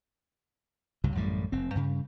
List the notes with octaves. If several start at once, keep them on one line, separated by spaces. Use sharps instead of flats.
C#2 G2 C3
A1 F#2 A2 G3
F1 C4
G2 C#3